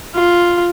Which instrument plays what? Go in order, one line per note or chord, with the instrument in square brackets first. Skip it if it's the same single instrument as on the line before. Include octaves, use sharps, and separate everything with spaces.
[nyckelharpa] F4